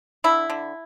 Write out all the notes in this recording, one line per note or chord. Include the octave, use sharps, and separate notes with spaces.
D3 E4
D3